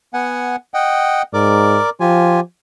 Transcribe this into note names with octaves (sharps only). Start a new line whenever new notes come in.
B3 F#5 G#5
D#5 F#5 G5
G#2 A#4 D5 D6
F3 F4 G4 G#5